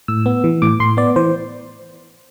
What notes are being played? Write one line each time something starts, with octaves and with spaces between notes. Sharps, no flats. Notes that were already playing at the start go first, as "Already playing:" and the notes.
A2 E6
B3
E3
A2 D6
A2 C6
B3 D5
E3 C5